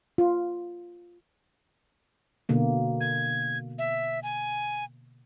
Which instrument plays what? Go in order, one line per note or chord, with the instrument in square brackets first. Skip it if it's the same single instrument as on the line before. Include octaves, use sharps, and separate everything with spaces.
[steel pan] F4
[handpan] B2 D3 A#3
[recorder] G#6
E5
G#5